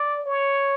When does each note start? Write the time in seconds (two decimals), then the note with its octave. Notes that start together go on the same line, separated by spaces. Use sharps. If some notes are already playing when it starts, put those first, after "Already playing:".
Already playing: D5
0.26 C#5